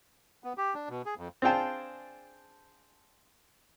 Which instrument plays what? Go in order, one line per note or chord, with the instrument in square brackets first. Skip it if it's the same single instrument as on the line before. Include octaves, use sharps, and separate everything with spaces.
[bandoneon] B3
G4
D4
B2
G#4
F2
[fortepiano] C4 D4 F4 G#4 G5 A5